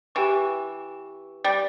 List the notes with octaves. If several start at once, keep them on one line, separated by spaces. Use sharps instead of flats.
E3 G4 B4 G5 C#6
G3